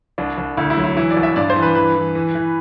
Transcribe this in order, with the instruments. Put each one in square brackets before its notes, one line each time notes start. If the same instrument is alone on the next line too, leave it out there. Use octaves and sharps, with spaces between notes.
[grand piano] C2 D4
C2
D2 E4
E4
F#3
E4
E3 E4
D5
C2
E5
G2 D5
C5
E3
B4
E3 B4
E3
E3
E3